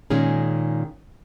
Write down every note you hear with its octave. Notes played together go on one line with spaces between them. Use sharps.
A#2 D#3 G#3 C#4 G#4